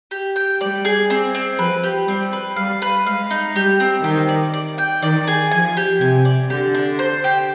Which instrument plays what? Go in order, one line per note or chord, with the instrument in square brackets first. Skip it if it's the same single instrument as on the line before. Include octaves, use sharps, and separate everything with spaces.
[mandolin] G4
G5
[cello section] G3 [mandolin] D5
[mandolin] G#4
C4
C4
[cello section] F3 [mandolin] B4
[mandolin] G4
[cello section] G3 [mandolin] C4
[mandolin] B4
[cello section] G3 [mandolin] F5
[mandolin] B4
[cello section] G#3 [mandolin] F5
[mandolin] D#4
[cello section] G3 [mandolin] G4
[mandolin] C4
[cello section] D#3 [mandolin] G4
[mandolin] D5
D5
G5
[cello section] D#3 [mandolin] D5
[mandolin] G#4
[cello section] F3 [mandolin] G#5
[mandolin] G4
[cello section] C3 [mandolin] G#5
[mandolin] D5
[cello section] D3 [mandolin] G4
[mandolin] D4
C5
G4